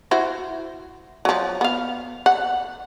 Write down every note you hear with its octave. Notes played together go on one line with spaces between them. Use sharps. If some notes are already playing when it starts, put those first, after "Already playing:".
E4 F#4 C5
F3 F#3
B3 F5
F#5